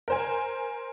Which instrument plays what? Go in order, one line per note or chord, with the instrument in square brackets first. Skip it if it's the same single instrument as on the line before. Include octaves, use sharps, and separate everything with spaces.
[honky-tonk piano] A#4 C5 G#5